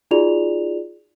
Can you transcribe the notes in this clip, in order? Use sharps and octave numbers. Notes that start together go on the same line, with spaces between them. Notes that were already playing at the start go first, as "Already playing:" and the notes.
D#4 F4 F#4 G#4 D5 F7